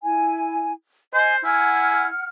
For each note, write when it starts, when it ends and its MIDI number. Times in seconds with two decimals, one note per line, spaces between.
0.02 0.72 64
0.02 0.72 80
1.14 1.39 72
1.14 1.38 75
1.14 1.36 80
1.44 2.07 64
1.44 2.27 78
1.44 2.03 80
1.44 2.27 89